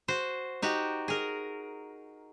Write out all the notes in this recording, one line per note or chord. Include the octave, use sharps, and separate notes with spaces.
F#4 C5
D#4 F#4 G4
G#4 A#4